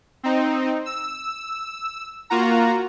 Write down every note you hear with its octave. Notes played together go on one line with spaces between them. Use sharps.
C4 D#4
E6
A#3 F4 F#4 A#5